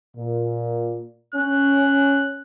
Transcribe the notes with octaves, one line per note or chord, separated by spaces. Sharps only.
A#2
C#4 F#6